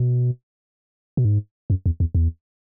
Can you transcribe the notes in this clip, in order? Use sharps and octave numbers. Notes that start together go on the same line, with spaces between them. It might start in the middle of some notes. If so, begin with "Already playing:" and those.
Already playing: B2
B2
G#2
F#2
E2
E2
E2